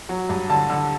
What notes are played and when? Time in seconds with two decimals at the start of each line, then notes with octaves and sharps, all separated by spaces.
0.09 F#3
0.29 G2
0.50 D3 A5
0.70 D3